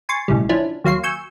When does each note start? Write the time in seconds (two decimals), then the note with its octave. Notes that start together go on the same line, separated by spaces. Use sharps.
0.09 G#5 C6 C#6 A6
0.28 B1 A2 C#3 G3
0.49 F3 C#4 D4 E4
0.84 D#2 F#3 F5 C6 C7
1.03 G#5 C#6 E6 G6